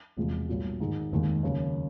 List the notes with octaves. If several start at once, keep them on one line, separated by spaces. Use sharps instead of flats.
E1 E2 C3 F3 G#3
B1 A#2 G3
G#2 D#3 G#3
F1 D#2 D#3 G#3
D#2 C#3 F#3